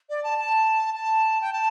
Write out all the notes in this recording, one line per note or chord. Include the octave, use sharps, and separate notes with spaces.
D5
A5
A5
A5
G5
A5